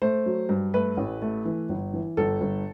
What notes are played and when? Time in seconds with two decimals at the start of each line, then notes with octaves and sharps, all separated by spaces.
0.02 A3 C5
0.26 F#3
0.49 G2
0.74 A3 B4
0.97 A1
1.22 A3
1.45 E3
1.69 G1
1.94 E3
2.17 G1 A4
2.41 G1